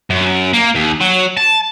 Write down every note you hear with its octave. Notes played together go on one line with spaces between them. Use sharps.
F#2
A#3
D#2
F#3
A5